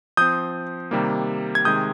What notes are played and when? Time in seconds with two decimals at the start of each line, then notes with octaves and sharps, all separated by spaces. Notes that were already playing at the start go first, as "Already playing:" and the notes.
0.17 F3 C4 D#6 G6
0.91 C3 D#3 G3 A#3
1.55 G#6
1.65 C3 D#3 G#3 D#6 G6